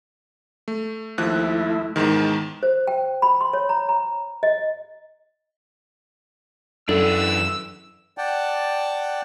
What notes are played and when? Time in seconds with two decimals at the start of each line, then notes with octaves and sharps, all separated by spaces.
0.68 A3
1.18 D#2 F3 A3 E4 F#6
1.96 E2 G#2 D#3 A5
2.63 C5
2.87 G5
3.22 B5
3.41 C6
3.53 C#5
3.69 A#5
3.89 A#5
4.43 D#5
6.89 F#2 E3 D4 A4 E6
8.18 D5 F#5 G5 A5